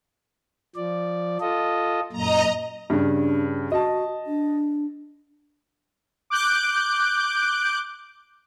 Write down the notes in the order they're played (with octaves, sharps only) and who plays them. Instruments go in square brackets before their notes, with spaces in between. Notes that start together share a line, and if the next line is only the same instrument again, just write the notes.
[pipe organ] F3 D5
F4 A4 D#5
[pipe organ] F#2 A#2 [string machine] D#5 A#5
[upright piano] G2 C#3 [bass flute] D4
[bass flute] F#4 [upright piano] D#5 A5
[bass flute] D4
[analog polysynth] D6 F#6 G6 D7